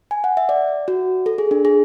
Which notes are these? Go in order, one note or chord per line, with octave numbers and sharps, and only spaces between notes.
G#5
F#5
E5
D5
F#4
A4
G#4
D4
G#4